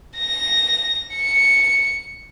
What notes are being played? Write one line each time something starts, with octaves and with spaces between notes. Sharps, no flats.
A#6
C#7